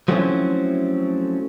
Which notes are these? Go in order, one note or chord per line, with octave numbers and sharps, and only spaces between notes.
F3 F#3 A3 C4 C#4 E4